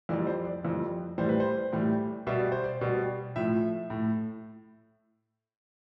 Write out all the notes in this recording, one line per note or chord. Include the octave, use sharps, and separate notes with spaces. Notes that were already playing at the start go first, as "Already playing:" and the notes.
F2 E3 G3 D5
C5
D5
F2 E3 G3
A2 E3 G3 C5
B4
C5
A2 E3 G3
B2 G3 E5
D5
C5
D5
B2 G3
A2 F3 E5
A2